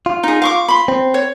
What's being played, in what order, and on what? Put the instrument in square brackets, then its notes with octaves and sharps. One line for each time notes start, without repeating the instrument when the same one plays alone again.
[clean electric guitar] F4
[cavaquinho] D#4 G#4
F5 C#6 D6
B5 C6
[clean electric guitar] C4
[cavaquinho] C#5